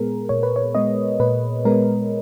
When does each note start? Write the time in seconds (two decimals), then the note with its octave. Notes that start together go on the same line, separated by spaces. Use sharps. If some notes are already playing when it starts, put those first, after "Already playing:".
Already playing: A#2 G#3 B3 G#4 A#4
0.29 A#2 C#5
0.43 B4
0.56 C#5
0.75 G#3 B3 D#5
1.20 A#2 B4
1.65 G#3 B3 A#4